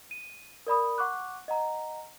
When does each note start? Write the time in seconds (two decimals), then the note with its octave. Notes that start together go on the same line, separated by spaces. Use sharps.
0.11 D#7
0.67 A#4 D5 B5 D#6
0.98 F#5 C#6 D6 F#6
1.48 D#5 F#5 A#5